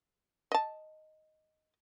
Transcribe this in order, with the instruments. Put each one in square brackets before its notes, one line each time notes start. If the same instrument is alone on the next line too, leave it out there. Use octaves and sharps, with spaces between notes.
[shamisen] D#5 A5